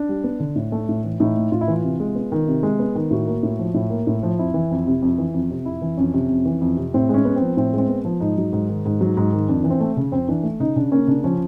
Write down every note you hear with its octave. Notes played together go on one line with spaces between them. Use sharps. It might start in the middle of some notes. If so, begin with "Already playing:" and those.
Already playing: D4
G3
B3
D3
A2
A3
A2
E3
A2 D#4
A3
A2 F4
E4
E3 F4
C3
G#3
B3
D#3
C3
G#3
B3
D#3
A2 F#4
A#3
A2
F3
A2
A#3
A2
F3
F2 E4
E3
F2
C3
F2
E3
F2
C3
F2 E4
E3
F2 C#4
C3
F2
E3
F2
C3
A2 C4
G#3 C#4
B3
C4
F3
A2 C4
G#3 C4
B3
F3
G#2 D#4
F#3
G#2
D#3
G#2
F#3
G#2
D#3
F2 D4
E3
C4
A3
C#3
F2 C4
E3 D4
A3
C#3 D#4
C#3 D4
A#3 C#4
C#3 D4
F3 C#4